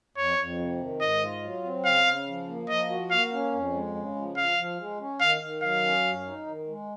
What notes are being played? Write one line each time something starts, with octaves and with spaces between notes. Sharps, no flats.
F2 C#5
F2
C3
D#3
G#2 D#5
F4
F#3
C4
C#3 F5
C#3
F3
A#3
F3 D#5
F#4
A#3 F5
C#4
F2
G#3
C#3
F3
F3 F5
F3
G#3
C#4
D#3 F5
D#3
F#3 F5
C#4
F#2
D#4
D#3
G#3